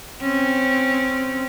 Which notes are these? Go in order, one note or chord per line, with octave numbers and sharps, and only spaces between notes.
C4 C#4